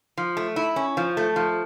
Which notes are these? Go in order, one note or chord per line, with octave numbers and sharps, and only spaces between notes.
F3
A3
E4
C#4
F3
A3
F3